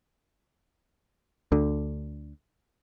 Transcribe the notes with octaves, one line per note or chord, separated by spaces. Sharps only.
D2 D3